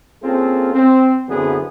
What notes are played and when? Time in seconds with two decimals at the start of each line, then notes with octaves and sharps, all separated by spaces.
0.23 A#3 C4 C#4 F4 G#4 A4
0.74 C4
1.28 F#2 D3 E3 B3 C4 G#4